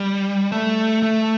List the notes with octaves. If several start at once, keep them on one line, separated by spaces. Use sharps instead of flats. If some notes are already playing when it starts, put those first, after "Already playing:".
Already playing: G3
A3
A3